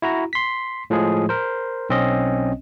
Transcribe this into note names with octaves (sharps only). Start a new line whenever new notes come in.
E4 F#4 A#5
C6 B6
A2 F3 G#3 G#4
A#4 C5
B1 C4 C#4 D#5